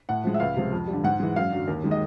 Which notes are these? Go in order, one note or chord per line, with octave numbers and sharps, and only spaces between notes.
A2 F#5
F3 G#3
E5
C#2 F5
C3 F3 G#3
F2
G3
D3
G#2 F#5
E3 G#3
F#2 F5
D3 F#3
D#2
D#3 G#3
D#5